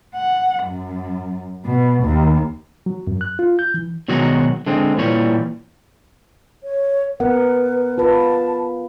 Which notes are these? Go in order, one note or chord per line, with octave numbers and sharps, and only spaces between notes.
F#5
F#2
B2
D#2
F#3
F#2
F#6
F4
G6
E3
B2 D#3 F#3 G#3 D#4 F#4
D3 G#3 C4
A#2 E3 G3 C#5
C#5
B3 A#4 B4 F#5
F4 B4 A5